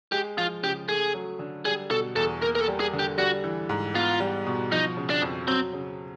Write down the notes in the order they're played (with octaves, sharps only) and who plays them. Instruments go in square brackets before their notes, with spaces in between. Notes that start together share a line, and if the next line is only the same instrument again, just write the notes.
[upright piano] G#3 [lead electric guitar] G4
[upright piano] F3 [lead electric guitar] F4
[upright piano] C#3 [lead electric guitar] G4
[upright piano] A3 [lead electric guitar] G#4
[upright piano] F#3
D3
[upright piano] G3 [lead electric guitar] G#4
[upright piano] B2 [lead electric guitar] A4
[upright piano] E2 [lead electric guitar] A4
[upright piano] A#3 [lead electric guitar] A#4
[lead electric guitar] A#4
A4
[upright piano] G3
[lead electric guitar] G#4
[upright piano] D3
[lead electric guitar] G4
[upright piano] G3 [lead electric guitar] F#4
[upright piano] E3
G#2
[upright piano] B3 [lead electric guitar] F4
[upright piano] G3
B2
[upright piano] F3 [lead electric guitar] D#4
[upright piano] C#3
[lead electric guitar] D4
[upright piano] F2
[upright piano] F#3 [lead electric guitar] C4
[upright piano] C#3